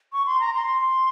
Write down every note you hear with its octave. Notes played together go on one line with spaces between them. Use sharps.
C#6
C6
A#5
C6